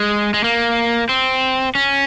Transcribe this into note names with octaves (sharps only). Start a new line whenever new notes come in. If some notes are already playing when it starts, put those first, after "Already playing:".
Already playing: G#3
G#3
A#3
C4
C#4